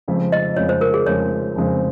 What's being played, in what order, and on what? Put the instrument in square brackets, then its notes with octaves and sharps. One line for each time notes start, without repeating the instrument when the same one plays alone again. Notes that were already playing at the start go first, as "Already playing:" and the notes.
[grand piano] F1 F2 C#3 G#3 C4
[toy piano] D#5
[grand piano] F1 F2 C#3 G#3 C4 [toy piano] C#5
[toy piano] C5
A#4
G#4
[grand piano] F1 F2 C#3 G#3 C4 [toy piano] C#5
[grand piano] F1 F2 C#3 G#3 C4